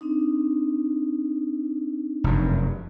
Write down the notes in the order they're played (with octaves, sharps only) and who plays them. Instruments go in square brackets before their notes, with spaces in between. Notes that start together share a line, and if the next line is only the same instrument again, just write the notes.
[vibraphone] C4 D4 D#4
[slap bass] F1 F#2